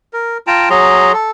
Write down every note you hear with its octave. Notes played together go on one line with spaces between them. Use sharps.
A#4
F4 G5 A5 A#5
F#3 G#4 A#5 C6
A4